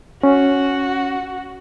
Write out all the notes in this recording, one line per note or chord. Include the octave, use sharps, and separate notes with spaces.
C#4 F#4